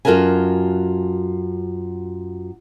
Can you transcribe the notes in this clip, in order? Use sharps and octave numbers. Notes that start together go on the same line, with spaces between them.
F#2 F4 F#4 A4 A#4 G#5